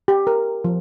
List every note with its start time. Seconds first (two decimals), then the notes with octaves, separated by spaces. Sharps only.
0.08 G4
0.27 A#4
0.64 F3